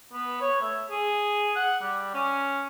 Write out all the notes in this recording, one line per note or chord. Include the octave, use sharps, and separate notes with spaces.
B3
C#5
A3
G#4
F#5
G3
C#4